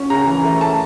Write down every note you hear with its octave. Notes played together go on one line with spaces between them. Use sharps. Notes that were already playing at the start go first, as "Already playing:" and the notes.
Already playing: C#4
C#3 A#5
E3
A3
A5